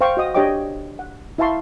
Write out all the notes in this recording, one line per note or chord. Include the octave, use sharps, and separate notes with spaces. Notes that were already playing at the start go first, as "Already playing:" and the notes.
C5 F5 G5 C#6
F#4 D#5 D#6
D4 G4 C#5 D#5 G5 D6
F#5
E4 E5 F5 A5 C6 C#6